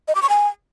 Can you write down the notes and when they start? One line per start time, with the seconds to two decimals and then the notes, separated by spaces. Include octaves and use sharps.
0.08 D#5
0.15 D6
0.22 C#6
0.30 G#5